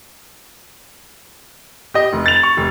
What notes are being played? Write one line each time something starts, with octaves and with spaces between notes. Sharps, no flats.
G4 D#5
F1
A6 F7
C#6
F1